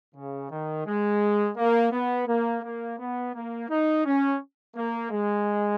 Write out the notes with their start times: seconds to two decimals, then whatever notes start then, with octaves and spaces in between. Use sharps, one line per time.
0.15 C#3
0.51 D#3
0.86 G#3
1.57 A#3
1.92 B3
2.28 A#3
2.63 A#3
2.99 B3
3.34 A#3
3.69 D#4
4.05 C#4
4.76 A#3
5.11 G#3